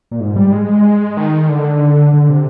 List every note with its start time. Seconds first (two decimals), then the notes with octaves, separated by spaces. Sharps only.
0.11 A#2
0.20 G#2
0.36 G3
0.52 G#3
1.17 D#3
1.49 D3
2.13 D3
2.30 C3